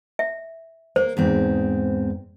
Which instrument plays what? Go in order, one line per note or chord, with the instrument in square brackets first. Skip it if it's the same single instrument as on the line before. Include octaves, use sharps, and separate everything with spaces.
[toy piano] E5
[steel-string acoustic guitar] A#3 [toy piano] C5
[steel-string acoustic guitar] E2 G#2 C4